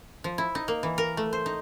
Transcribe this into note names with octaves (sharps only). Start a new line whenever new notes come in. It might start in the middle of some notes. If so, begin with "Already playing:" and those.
F3
E4
D#4
A#3
E3
A#4
A3
C5
D#4